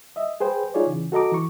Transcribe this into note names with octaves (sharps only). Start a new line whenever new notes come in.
D#5 E5
G#4 B4 C5 G5
D#4 F4 G#4 C#5 D5
C#3 E3
F#4 A4 D#5 A#5 D6
E3 C#6